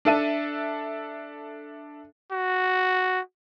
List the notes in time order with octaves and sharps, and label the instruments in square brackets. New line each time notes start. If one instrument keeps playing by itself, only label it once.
[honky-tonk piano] D4 A4 E5 D#7
[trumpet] F#4